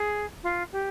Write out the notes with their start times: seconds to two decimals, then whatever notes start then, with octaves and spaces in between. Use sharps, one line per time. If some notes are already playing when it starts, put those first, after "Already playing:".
Already playing: G#4
0.43 F4
0.72 G4